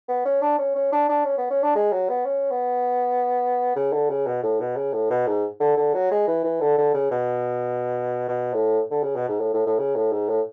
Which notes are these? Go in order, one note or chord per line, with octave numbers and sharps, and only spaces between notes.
B3
C#4
D4
C#4
C#4
D4
D4
C#4
B3
C#4
D4
G#3
F#3
B3
C#4
B3
C#3
D3
C#3
B2
A2
B2
C#3
A2
B2
G#2
D3
D3
F#3
G#3
E3
E3
D3
D3
C#3
B2
B2
A2
D3
C#3
B2
G#2
A2
A2
A2
C#3
A2
G#2
A2